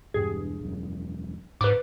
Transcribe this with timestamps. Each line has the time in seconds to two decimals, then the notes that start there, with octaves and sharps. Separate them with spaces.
0.14 E1 G2 G#4
0.61 E1 F#2
1.61 G#2 B4 D6